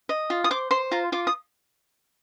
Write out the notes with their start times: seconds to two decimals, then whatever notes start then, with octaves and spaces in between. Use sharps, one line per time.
0.09 D#5
0.30 F4
0.44 D#6
0.51 C5 D6
0.71 C5 C6
0.91 F4 A#5
1.12 F4 D6
1.27 D#6